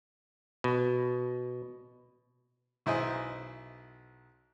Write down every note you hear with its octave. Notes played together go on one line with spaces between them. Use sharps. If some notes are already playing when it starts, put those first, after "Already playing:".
B2
B1 E4 C5 D#5 G#5